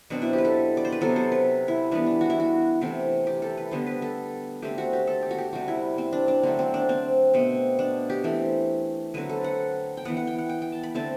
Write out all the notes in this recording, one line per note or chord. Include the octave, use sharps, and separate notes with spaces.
B2 F#3 C4 D4
E4
G4
B4
A4
D5
C5
B4
C3 F#3 B3 A4
C5
B4
E4
E3 G3 B3 D4
D4
F#4
E4
F#4
C3 E3 A3 C4
G4
A4
B4
D3 G3 B3 C5
B4
A4
D3 A3 C4 G4
F#4
G4
A4
G4
F#4
G4
C3 G3 C4 F#4
E4
C4
D4
D4
D3 F#3 A3 C4
C4
D4
C4
B2 A3 C4
D4
G4
E3 A3 C4
D3 F#3 C4 B4
A4
F#5
G5
E3 B3 F#5
F#5
G5
F#5
G5
G5
A5
B5
D3 A3 C4 A5